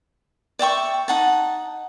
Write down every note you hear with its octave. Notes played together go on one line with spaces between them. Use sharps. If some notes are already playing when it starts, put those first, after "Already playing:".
D5 E5 G5 C#6
D#4 F#5 A5